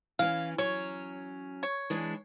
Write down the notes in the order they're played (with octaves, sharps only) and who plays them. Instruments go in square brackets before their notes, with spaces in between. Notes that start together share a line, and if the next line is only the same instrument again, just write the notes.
[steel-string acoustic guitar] E3 C#4 [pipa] F5
[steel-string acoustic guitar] F#3 C#4 [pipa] C#5
[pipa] C#5
[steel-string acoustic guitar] E3 G#3 D4